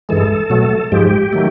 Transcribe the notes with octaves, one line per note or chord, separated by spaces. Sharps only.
G2 E3 G#3 A4
B2 F#3 A3
G#2 F3 G#3 G4
D#3 F#3 A3